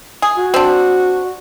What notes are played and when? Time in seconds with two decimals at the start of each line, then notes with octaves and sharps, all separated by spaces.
0.22 G#4
0.37 F#4
0.54 C4 D4